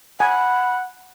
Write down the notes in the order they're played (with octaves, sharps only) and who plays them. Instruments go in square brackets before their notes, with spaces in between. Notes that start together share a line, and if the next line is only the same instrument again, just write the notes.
[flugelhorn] F#5 [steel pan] G#5 [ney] B5